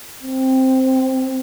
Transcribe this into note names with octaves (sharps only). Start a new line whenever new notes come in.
C4